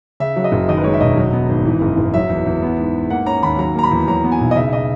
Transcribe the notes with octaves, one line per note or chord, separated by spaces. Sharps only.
C#3 E5
F#3
D#5
F#1
D#3 D#5
B4
G#3 C#5
E5
E1 D#5
F#3
B3
G#1
E3
F#1
F#1
F#3 E5
E2
E2
B3
G#2
G#2
A#3 F#5
C#4 A#5
D#2 B5
F#3 A#5
A#3 A#5
B5
E2
F#3 A#5
B3
G#5
B1
D#5
C#3 E5
D#5